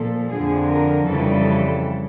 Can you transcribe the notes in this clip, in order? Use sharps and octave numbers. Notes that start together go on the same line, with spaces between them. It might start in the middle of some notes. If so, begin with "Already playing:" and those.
Already playing: A#2 F3 A4
F2 D3 F3 G#4
A#4
F2 C#3 E3 G3 A4